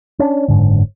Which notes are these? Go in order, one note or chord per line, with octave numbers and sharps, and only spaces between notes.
C#4 D4
F#1 G#2 D3